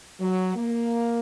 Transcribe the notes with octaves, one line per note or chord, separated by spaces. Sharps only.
F#3
A#3